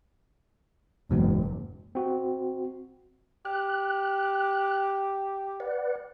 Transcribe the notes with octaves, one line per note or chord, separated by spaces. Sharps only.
F#1 E2 G#2 B2
C4 F#4
G4 F#6
B4 D5 F#5